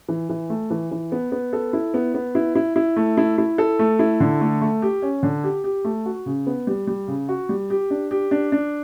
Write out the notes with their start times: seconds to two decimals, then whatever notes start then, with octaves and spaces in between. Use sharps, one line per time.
0.09 E3
0.29 E3
0.50 A3
0.70 E3
0.91 E3
1.12 B3
1.32 B3
1.53 A4
1.73 E4
1.94 B3
2.14 B3
2.35 E4
2.55 E4
2.76 E4
2.97 A3
3.17 E4
3.38 E4
3.58 A4
3.79 A3
3.99 E4
4.20 D3
4.41 A3
4.61 A3
4.82 G4
5.02 C#4
5.23 D3
5.44 G4
5.64 G4
5.85 A3
6.05 F#4
6.26 C#3
6.47 B3
6.67 G3
6.87 G3
7.08 C#3
7.29 F#4
7.49 G3
7.70 G4
7.90 D4
8.11 G4
8.31 D4
8.52 D4